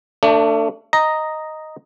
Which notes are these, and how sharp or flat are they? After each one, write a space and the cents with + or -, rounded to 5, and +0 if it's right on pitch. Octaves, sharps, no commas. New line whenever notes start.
A3 +30 D4 +0
D#5 +0 A#5 +0